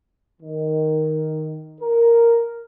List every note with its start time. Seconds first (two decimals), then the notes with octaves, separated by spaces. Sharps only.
0.41 D#3
1.81 A#4